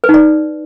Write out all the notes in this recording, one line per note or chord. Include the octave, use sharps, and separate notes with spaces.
B4
D#4
D5